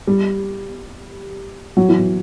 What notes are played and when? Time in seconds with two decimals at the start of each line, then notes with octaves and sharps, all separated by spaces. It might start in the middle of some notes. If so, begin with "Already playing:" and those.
0.07 G3
1.77 F#3
1.89 E3
1.99 F#3